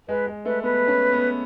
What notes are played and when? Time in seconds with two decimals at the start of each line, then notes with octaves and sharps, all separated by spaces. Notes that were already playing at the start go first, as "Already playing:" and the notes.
0.09 G#3 B4
0.26 G#3
0.45 A3 B4
0.63 B3 B4
0.87 C#4
1.12 B3